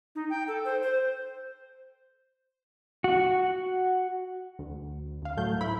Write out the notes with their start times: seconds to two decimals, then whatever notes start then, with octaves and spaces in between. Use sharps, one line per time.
0.15 D#4
0.30 G5
0.47 A4
0.65 C5
0.82 C5
3.04 F#4
4.59 D2
5.22 D2 F5
5.37 A2 F#3 A3 G6
5.61 G#2 E4 B5